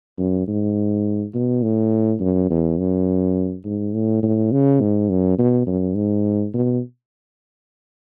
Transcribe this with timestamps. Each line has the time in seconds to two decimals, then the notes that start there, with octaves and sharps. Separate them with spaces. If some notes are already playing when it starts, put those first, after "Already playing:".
0.18 F#2
0.48 G#2
1.35 B2
1.63 A2
2.20 F#2
2.50 E2
2.79 F#2
3.65 G#2
3.94 A2
4.23 A2
4.52 C#3
4.81 G#2
5.10 F#2
5.39 B2
5.67 F#2
5.95 G#2
6.54 B2